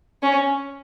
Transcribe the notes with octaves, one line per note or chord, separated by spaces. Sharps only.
C#4